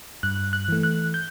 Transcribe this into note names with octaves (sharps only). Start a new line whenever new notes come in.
G2 F#6
F#6
E3 A3
F#6
G6